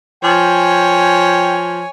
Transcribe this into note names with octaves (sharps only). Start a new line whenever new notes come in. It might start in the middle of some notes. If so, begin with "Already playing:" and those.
F3 C#5 G5 G#5